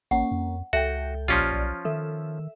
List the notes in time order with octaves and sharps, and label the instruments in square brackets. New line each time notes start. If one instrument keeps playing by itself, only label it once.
[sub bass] A1 [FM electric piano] A#3 C#4 [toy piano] F#5
[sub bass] F2
[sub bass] C#2 [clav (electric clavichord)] F#4 [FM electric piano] A4 G5 [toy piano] E5
[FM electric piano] A#1 G4 D5 [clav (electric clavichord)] F3 C#4 F4
[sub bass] B1
[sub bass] D#3 [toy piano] A4 [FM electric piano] E5